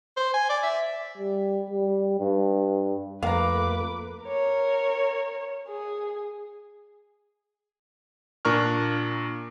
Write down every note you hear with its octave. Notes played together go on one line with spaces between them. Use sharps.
C5
G#5
D5
E5
G3
G3
G2
F2 A3 A#3 B4 F5 A#5 D6
A#4 C#5
G#4
A#2 D4 A#4 C#6 F6